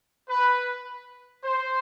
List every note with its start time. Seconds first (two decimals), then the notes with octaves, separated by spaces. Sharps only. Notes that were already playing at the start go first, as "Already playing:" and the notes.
0.29 B4
1.44 C5